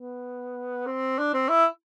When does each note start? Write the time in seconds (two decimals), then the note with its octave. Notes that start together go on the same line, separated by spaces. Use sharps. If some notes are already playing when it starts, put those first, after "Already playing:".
Already playing: B3
0.87 C4
1.19 D4
1.34 C4
1.49 E4